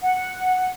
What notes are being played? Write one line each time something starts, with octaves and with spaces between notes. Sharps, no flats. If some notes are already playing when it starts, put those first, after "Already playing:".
F#5